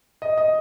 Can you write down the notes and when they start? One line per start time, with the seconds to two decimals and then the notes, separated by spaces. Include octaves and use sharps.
0.22 D#5
0.38 D#5